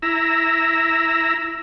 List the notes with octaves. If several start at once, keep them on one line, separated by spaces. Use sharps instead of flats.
E4 A#5 E6